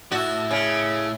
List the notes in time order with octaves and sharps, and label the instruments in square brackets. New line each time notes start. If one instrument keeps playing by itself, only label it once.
[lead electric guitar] A2 E4 [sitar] F#4
[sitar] C#3